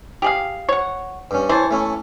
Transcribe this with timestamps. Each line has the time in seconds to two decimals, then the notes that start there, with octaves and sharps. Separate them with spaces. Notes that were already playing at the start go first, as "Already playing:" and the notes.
0.22 G4 G#4 F5
0.69 C#5 F#5
1.31 G2 C#4
1.49 E3 C5 C#5 A5
1.71 A3 C#4 E4